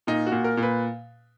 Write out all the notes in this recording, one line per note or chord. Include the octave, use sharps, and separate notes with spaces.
A#2 D#4
F#4
A#2
A#4
A#2
B4